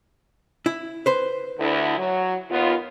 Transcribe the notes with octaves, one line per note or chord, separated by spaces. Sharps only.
E4
B4 C5
D2 D3 E4
F#3
D#2 B3 F4